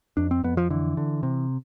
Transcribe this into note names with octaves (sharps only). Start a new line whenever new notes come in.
F2 D4
C4
F2 B3
F3
D3 E3
D3
C3